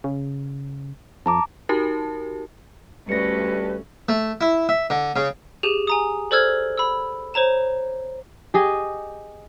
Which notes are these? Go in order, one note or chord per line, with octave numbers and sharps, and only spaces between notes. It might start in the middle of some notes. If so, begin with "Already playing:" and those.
C#3
F2 A5 A#5 D6
D#4 F#4 G4 A#4 A5
D2 G3 C#4 A4 B4 A#6 C#7
A3
E4
E5
D3
C#3
G4 G#4 D#7 F7
G#5 A#5 D#6
A4 C5 D5 E6 F6 G#6
B5 E6
C5 C#5 A#5 E7
G4 G#4 D#5